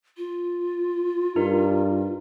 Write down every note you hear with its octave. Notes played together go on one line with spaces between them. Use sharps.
F4
G2 D#4 A#4